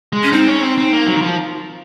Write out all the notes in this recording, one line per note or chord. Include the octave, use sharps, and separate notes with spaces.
G#3
C#4
C4 D#4
C#4
C4
C4
A#3
F#3
D#3
F3